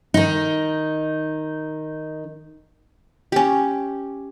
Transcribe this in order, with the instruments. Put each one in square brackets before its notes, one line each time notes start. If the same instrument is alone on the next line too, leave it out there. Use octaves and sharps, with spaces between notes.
[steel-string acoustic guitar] D#3 D#4
[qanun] C#4 G4